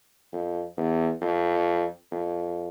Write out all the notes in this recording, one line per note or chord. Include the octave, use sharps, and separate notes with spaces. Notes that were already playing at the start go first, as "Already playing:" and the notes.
F2
E2
F2
F2